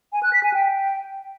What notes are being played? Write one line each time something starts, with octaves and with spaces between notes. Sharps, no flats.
G#5
F#6
B6
G#5
G5